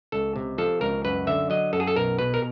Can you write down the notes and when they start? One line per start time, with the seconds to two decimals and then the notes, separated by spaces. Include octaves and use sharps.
0.12 C#2 A4
0.36 C3
0.58 F3 A4
0.81 C#2 A#4
1.05 F#2 B4
1.27 D3 E5
1.50 F#3 D#5
1.73 F#2 A4
1.80 G#4
1.87 A4
1.96 B1 A#4
2.19 B2 B4
2.34 A#4